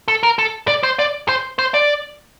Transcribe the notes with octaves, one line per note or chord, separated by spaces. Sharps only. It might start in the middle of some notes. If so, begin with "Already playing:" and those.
A4
A#4
A4
D5
C5
D5
C5
C5
D5